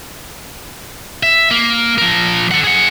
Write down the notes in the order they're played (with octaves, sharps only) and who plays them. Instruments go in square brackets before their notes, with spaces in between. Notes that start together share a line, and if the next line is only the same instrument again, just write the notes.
[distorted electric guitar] E5
A#3
F3 A#4
A4 F#5
G#4 F#5